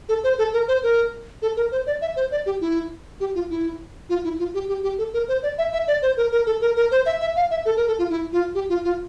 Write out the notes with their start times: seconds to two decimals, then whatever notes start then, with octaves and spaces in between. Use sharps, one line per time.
0.09 A4
0.24 C5
0.38 A4
0.53 A#4
0.68 C5
0.83 A#4
1.42 A4
1.57 A#4
1.72 C5
1.86 D5
2.01 E5
2.16 C5
2.31 D5
2.46 G4
2.61 E4
3.20 G4
3.35 F4
3.50 E4
4.09 F4
4.24 E4
4.39 F4
4.54 G4
4.68 G4
4.83 G4
4.98 A4
5.13 A#4
5.28 C5
5.43 D5
5.58 E5
5.73 E5
5.88 D5
6.02 C5
6.17 A#4
6.32 A#4
6.46 A4
6.61 A#4
6.76 A#4
6.91 C5
7.06 E5
7.21 E5
7.36 F5
7.51 E5
7.65 A4
7.77 A#4
7.87 A4
7.98 F4
8.10 E4
8.33 F4
8.55 G4
8.69 F4
8.84 F4